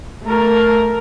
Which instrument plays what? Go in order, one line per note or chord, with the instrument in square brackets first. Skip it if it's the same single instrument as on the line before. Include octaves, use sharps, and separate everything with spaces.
[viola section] A3 A#4